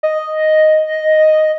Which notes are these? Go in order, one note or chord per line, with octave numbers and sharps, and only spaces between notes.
D#5